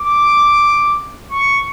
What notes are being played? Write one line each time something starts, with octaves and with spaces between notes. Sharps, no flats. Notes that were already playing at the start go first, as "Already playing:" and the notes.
Already playing: D6
C#6